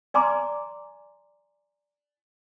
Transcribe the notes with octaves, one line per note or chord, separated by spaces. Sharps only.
D5 G#5 A#5 C6 D6